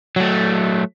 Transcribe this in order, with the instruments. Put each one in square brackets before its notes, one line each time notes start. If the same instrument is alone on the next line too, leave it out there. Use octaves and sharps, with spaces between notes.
[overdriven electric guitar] F#3 A3